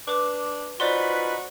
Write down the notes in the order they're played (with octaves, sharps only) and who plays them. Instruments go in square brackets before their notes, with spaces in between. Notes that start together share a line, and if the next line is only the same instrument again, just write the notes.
[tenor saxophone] D4 [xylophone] B4 D6
[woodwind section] D#4 F4 B4 [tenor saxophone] F#4 [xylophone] C5 D5 C6